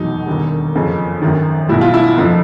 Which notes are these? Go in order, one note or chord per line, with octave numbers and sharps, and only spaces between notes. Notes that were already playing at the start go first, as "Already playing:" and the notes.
Already playing: F1 E2 B2 F#3 D#4
E1 D#2 D3 G3
F#1 F2 C#3 F3
G#1 F#2 D#3
B1 B2 G3 E4
F4
E4
F#1 F2 D3 F3